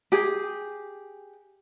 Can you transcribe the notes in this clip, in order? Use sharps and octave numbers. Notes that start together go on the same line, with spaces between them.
G4 G#4